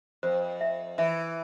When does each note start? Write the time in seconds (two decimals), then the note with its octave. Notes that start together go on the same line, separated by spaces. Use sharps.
0.23 F2 C5
0.61 E5
0.98 E3 E5